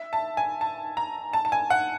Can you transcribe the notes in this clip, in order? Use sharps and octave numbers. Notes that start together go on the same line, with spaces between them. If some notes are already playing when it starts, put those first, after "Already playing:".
Already playing: E5
A5
G#5
A5
A#5
A5
A5
G#5
F#5